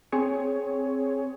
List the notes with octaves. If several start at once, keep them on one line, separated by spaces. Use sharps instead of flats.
C4 G#4 C#5